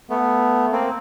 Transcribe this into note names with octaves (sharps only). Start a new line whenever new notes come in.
A3 B3
A#3 C4